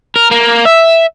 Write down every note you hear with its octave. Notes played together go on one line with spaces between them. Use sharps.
A#4
A#3
E5